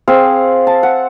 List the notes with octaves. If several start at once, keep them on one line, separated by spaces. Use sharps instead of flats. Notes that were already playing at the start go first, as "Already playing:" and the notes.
C4 G#4 F5
A5
F#5